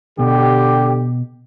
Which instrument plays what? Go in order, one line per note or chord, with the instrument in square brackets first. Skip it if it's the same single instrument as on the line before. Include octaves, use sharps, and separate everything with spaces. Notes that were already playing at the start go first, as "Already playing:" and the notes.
[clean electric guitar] B2 [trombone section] D3 G4